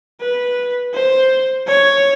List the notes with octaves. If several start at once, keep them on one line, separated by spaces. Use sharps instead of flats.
B4
C5
C#5